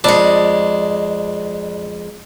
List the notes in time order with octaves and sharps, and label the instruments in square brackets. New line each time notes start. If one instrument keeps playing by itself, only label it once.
[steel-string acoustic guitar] F2 G#3 [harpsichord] D4